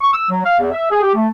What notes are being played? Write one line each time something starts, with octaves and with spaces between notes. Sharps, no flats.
C#6
E6
F#3
F5
E2
E5
G#4
G4
A3